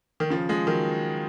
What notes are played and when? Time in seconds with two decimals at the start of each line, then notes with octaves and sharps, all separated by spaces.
0.20 D#3
0.30 C#3 F3
0.49 F3 G#3
0.67 D#3 F#3